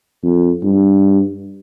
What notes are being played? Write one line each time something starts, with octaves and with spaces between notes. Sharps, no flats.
F2
G2